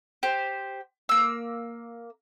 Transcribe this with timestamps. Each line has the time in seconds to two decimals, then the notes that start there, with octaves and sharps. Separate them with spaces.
0.23 G4 C5
1.09 A#3 E6